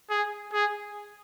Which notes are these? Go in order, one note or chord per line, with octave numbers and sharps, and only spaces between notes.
G#4
G#4